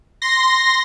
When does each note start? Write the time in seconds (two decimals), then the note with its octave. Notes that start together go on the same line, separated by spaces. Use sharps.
0.22 C6 A#6